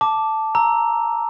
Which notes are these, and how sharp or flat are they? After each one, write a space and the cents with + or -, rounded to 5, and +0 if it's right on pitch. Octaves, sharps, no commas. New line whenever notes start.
A5 +0 D6 +0
A#5 +0 E6 -5